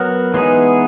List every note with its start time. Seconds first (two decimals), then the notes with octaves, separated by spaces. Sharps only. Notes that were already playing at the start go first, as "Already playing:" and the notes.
Already playing: F#3 B3 F#4 A#4 C#5
0.34 E3 G#3 B3 D#4 G#4